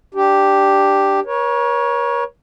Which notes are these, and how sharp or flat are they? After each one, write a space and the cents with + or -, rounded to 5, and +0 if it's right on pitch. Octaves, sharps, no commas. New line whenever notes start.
D4 +0 G4 +0
A#4 +45 C#5 +0